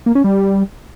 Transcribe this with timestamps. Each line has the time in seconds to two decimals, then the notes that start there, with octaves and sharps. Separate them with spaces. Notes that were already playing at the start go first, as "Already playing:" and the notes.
0.06 A#3
0.15 C#4
0.24 G3